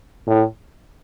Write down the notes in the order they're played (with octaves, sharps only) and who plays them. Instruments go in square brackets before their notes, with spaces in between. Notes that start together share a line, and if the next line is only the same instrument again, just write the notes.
[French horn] A2